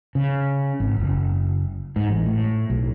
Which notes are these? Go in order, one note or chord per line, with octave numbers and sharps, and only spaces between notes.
C#3
G#1
F#1
G#2
A1
A2
B1